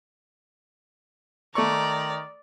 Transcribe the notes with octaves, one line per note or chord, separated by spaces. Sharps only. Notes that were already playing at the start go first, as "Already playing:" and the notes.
D#3 A3 D5 A#5 C#6